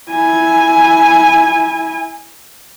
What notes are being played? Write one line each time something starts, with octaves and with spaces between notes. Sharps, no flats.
E4 G#5